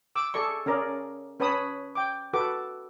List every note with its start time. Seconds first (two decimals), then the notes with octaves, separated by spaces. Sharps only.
0.15 D6 E6
0.34 G#4 A4 D5 C#6
0.66 C#4 G#4 A#4 D5
1.40 C#4 B4 C#5 A5 B5 D#6
1.95 G5 D6
2.33 F#4 A4 B4 D6